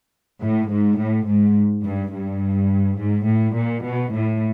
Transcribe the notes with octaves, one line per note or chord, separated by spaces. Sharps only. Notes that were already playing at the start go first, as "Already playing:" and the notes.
A2
G#2
A2
G#2
G2
G2
G#2
A2
A#2
B2
A2